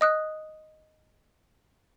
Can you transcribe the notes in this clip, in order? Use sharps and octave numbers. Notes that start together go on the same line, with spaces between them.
D#5 D#6 F#6